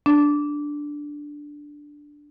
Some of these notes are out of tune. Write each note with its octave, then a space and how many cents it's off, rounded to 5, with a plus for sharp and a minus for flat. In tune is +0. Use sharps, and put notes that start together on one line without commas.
D4 +0